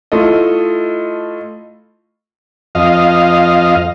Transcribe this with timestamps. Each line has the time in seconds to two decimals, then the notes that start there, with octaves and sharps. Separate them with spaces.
0.12 A3 E4 F4 A4 D#5
2.75 F2 D#5 F5